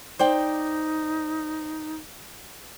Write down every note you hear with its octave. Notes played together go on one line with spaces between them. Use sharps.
D#4 C5 D5 G5